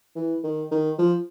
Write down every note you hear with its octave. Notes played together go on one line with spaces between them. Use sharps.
E3
D#3
D#3
F3